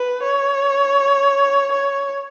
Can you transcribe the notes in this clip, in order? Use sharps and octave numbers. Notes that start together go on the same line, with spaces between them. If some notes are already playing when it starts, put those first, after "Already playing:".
Already playing: B4
C#5
C#5